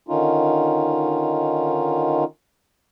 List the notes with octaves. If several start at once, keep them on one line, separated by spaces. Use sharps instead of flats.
D3 D#3 C#4 D#4 F4